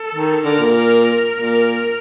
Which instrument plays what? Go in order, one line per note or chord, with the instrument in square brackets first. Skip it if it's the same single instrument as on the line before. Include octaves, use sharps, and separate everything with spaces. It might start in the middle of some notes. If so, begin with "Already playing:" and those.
Already playing: [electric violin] A4
[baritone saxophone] D#3
[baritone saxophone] D3 [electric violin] A#4
[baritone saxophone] A#2
[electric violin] A#4
A#4
[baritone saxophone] A#2